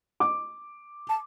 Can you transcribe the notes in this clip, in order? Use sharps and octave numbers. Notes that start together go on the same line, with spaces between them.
D6
A5